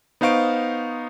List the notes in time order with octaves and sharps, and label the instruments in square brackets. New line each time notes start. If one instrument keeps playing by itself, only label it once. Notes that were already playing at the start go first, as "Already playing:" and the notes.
[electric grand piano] B3 D#4 C5 F5 C#6 D7